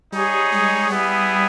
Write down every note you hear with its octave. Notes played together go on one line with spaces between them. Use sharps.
G3 D#4 G#4 C#5
G#3
G3 B3 E4 G#4